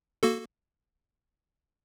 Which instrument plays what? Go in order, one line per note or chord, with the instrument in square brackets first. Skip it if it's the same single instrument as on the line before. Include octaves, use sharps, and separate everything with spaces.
[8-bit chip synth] A#3 F#4 A4